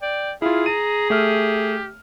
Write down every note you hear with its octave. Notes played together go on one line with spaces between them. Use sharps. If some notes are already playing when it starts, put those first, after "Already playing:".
D5 G5
E4 F4 G#4 F5
A#5 D#7
A3 G4 E5 F6